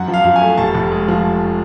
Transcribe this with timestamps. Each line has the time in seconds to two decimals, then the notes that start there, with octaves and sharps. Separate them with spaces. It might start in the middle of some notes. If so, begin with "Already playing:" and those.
Already playing: F#2 F#5
0.08 F3
0.14 F5
0.24 F#2
0.36 G#5
0.41 A3
0.58 F1 A5
0.75 F1
0.92 G#3
1.08 F3